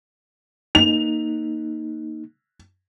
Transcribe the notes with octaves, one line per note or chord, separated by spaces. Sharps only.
A#3 D#4 F7